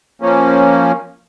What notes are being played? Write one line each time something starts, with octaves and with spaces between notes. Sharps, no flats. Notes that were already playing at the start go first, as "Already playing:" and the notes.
F3 A#3 C#4